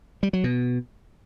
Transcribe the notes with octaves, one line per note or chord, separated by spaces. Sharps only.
G3
F#3
B2